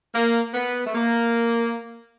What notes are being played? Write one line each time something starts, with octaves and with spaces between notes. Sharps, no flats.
A#3
B3
A3
A#3